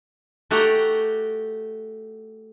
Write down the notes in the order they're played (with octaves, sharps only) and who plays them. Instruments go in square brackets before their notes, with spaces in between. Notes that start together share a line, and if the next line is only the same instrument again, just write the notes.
[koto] A3 F#4 G4 F#5 G5 A#5